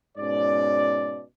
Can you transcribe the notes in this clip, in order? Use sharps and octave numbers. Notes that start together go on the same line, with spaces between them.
G#2 B2 C#4 D5